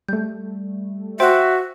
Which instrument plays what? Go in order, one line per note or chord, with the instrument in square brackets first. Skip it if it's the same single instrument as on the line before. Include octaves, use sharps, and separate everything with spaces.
[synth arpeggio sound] G3 A3 [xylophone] G6
[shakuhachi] F#4 [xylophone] C5 G5 C6 [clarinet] E5